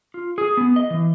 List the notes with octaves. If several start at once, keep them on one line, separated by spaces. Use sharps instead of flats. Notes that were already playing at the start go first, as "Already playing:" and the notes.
F4
G#4
B3
D#5
E3